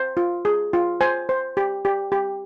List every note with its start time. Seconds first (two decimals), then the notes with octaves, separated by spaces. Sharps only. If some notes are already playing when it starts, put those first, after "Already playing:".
Already playing: C5
0.17 F4
0.45 G#4
0.73 F4
1.01 C5 G#5
1.29 C5
1.57 G4
1.85 G4
2.12 G4